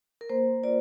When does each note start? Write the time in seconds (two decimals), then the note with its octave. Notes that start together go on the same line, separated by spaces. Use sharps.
0.21 A#4
0.29 A#3 C5
0.64 F4 D5